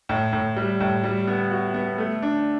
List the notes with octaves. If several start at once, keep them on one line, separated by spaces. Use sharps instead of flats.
A2
A2
G3
A2
G3
B3
F#4
B3
A3
D4